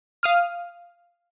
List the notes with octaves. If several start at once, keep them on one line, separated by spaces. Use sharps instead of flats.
F5 D#6 F6